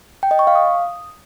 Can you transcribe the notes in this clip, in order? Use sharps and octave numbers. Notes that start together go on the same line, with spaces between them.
G5
D#5
C#6
F5
D#6